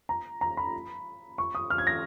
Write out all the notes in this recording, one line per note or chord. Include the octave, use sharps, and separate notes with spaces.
A#5
A#5
B5
C#6
D#6
F6
G#6
A#6